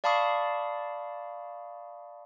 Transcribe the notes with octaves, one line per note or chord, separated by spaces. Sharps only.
D5 F5 A5 B5 C#6 D#6